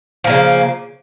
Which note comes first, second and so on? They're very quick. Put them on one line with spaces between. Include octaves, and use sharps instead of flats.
F3 A#3 C#3